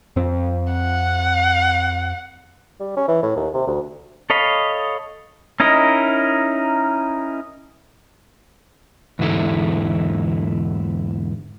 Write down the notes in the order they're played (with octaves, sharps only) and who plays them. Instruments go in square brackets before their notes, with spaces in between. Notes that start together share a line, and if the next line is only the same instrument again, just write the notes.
[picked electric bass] F2 C4
[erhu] F#5
[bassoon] G3
C#4
E3
A2
D#2
C3
D2
[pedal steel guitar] A4 C#5 D#5 F5 B5
C#4 D#4 E4 A#4 D#5
[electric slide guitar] E2 G#2 D3 E4 A4